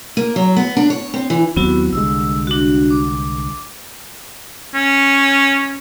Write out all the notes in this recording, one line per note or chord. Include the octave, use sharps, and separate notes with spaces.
A#3
F#3
B3
D4
C#5
C4
E3
D#2 F#3 B3 C4 E4 F#4
C2 D3 G#3 E6
D4 F#4
D6
C#4